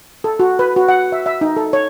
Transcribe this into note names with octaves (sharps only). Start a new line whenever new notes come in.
A4
F#4
B4
F#4
F#5
E5
E5
D#4
A4
C#5